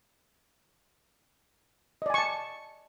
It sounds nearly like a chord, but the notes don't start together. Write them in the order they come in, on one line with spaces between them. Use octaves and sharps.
D#5 D5 G#5 C#6 A5